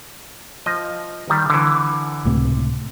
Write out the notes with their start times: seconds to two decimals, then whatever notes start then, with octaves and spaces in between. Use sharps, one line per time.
0.66 F3 D#5
1.30 D#3 G3
1.50 D3 E3
2.25 C#2 A2 C3